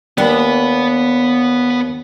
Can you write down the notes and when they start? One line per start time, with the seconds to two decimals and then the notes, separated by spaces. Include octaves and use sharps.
0.18 D#2 B3 D4 B4